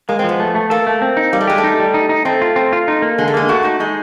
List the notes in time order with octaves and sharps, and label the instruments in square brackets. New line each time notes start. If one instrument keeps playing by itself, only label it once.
[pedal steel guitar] G#3 [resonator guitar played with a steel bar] A#3
[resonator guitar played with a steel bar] C4
[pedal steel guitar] F3 [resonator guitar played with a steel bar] B3
[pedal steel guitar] A3
A3
[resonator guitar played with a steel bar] A#3 [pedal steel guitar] A4
[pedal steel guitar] A3
C4
D#4
[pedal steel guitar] G3 [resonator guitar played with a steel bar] A#3
[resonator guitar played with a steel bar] A3
[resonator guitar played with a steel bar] G#3 [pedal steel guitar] G4
[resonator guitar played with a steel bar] A3
[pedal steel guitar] D#4
G3
D#4
D#4
[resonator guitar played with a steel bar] A3 [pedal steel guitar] C4
[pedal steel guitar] F4
C4
F4
D#4
A#3
[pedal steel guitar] D3 [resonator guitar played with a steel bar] G#3
[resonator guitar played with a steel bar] A3
[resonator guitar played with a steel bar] G#3 [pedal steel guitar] A#3
[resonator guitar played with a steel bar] A3 [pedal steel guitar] F#4
[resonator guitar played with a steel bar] A3 [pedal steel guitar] D#4
[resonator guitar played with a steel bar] G#3 [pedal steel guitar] D#4